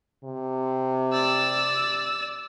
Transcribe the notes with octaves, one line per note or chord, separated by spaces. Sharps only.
C3
D5 E6